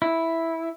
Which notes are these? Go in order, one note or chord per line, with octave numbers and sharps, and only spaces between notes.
E4